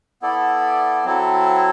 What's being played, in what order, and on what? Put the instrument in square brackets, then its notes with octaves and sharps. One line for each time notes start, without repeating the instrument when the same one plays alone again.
[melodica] B3 E4 A4 D5
F#3 C4 E4 A4